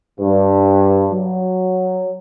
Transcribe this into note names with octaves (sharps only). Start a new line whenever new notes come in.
G2
F#3